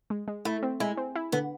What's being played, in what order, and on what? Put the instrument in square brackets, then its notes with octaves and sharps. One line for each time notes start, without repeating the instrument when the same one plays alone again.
[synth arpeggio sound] G#3
G#3
[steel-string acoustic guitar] A3 [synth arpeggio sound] E4
[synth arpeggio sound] C4
[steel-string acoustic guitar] G#3 [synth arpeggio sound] E4
[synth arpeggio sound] C4
E4
[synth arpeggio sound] D3 [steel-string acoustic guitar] B3